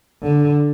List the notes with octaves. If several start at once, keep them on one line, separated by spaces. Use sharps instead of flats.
D3